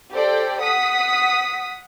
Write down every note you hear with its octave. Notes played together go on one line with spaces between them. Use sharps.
G4 A4 C5 D5 G5
F#5 D#6 B6